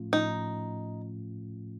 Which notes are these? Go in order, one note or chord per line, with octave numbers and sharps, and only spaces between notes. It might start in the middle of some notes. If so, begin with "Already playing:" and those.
Already playing: A2 F3 A3 C#4 F4
A2 F3 A3 C#4 D#4 F4